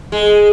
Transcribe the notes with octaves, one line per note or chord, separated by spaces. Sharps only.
G#3